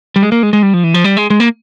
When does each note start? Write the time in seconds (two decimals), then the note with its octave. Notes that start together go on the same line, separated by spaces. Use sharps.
0.16 G3
0.22 G#3
0.32 A#3
0.43 G#3
0.53 G#3
0.63 G3
0.74 F3
0.84 E3
0.94 F3
1.04 G3
1.17 G#3
1.30 G#3
1.40 A#3